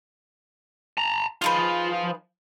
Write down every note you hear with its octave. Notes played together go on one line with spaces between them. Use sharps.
A5 A#5
F3 D#4 F4 G#4 B4